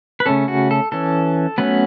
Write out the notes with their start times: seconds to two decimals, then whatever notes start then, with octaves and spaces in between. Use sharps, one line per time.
0.20 B4
0.26 C#3 A3 C#4 A4
0.48 F#4
0.71 A4
0.92 E3 C#4 A4
1.58 F#3 A3 B3 C#4 B4